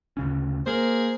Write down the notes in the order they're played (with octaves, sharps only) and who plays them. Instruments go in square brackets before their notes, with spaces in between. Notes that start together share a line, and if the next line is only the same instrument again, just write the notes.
[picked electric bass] D2 C#3 C#4
[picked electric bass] A#3 [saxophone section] G#4 A#4 C5